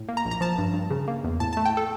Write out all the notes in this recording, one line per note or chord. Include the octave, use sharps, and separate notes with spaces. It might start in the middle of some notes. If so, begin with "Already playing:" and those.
Already playing: A2
A#3
A#5
A#1
A#5
F3 A5
G2
G2
C#3
A#3
E2
A2 A5
A5
A3
G5
A4